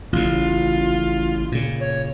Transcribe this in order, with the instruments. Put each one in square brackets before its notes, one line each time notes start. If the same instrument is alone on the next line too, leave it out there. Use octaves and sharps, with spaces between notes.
[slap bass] A1 C#3 [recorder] F4
[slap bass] A#2 C#3
[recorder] C#5